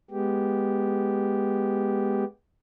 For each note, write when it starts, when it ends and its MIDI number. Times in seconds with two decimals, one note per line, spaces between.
0.11 2.25 56
0.11 2.25 59
0.11 2.25 67